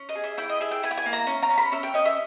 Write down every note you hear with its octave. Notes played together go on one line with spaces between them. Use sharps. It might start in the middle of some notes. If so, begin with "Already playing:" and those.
Already playing: C#4
D#5
G#4
E5
E4 G5
D#5
G#4 E5
G5
E4 G#5
G5
G#5
A#3
A#5
C#4
A#5
C#4
B5
C#4 E5
G5
C#4 D#5
E5